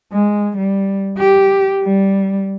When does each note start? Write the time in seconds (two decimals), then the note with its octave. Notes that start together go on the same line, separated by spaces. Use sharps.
0.12 G#3
0.57 G3
1.18 G4
1.83 G3